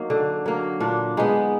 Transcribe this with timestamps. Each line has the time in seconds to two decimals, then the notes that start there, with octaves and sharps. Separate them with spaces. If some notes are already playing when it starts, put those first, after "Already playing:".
Already playing: F#3 A#3 D#4
0.10 D3
0.46 F#3 A#3
0.80 A#2 D4
1.17 G#3 B3 D#4